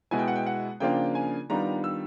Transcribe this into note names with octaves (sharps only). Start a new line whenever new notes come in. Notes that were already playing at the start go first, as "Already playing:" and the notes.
B2 G#3 B3 E4 G#5
G5
F#5
G5
F#5
C#3 F3 A#3 D4 F4 G5
G#5
D#3 G3 B3 D4 F4 A#5
E6